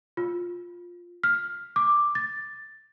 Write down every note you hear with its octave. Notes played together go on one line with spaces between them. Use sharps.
F4
F6
D6
A6